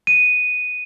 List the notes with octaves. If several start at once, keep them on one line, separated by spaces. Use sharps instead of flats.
D#7